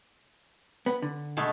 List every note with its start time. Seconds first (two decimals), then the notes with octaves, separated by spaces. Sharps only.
0.86 B3
1.02 D3
1.37 B2 G#3 A3